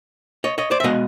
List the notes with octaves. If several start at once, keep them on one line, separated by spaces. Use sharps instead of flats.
C#5 D#5
C#5 D#5
C5 D5
E5
B2 G#3 B3 D#5 F5